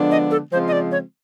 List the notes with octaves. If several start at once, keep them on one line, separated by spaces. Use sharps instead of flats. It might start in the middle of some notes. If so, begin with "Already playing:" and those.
Already playing: D3 F3 G#3 B3 D4
D#5
A4
C#3 F3 G#3 C4 F4 C5
D#5
D5
C#5